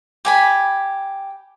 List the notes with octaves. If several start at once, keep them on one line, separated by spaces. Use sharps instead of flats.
G4 G#5 B5